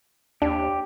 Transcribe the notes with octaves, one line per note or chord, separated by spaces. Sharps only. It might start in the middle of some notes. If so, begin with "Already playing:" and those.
D#2 D4 G4